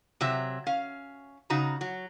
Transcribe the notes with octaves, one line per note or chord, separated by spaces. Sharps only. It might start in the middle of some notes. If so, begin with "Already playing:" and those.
C3 F#3 E5
C#4 F5
C#3 D#4 F#4 A#5
F#3